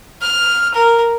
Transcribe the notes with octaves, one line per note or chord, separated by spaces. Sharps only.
F6
A#4